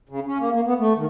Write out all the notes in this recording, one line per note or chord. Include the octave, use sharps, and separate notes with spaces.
C#3
C#4
A#3
A#3
B3
A3
D#3